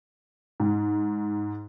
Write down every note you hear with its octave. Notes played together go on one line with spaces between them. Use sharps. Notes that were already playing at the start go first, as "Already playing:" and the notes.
G#2